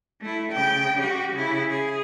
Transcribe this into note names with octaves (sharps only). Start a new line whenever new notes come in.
A3 E4
C#3 G5
F#4 G4
C#3 E4
G#4